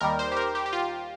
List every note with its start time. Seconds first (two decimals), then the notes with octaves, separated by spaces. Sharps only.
0.01 D#2 D#3 G3 A#4
0.19 C5
0.32 G4
0.37 A#4
0.55 G4
0.66 G4
0.73 F4